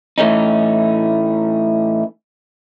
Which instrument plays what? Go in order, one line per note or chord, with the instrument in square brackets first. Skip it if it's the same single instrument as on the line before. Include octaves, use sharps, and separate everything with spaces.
[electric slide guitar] A2 E3 A3 C#4 D#4